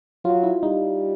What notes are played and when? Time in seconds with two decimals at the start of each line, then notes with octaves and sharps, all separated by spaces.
0.25 F#3 F4
0.43 E4
0.63 G3 D#4